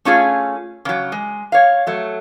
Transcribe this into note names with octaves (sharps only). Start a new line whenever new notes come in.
A3 C#4 F4 G#4
C#3 F#3
G#3
C#5 F5
F#3 A3